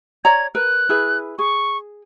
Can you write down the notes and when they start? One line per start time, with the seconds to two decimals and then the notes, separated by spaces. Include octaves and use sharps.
0.25 C#5 D5 A#5 G#6
0.55 A#4 B4 F#6
0.89 E4 G#4 B4
1.39 G#4 C#6